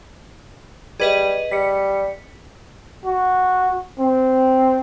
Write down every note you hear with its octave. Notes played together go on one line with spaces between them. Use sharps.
G3 G#4 B4 D#5
G3 B6 C#7
F#4
C4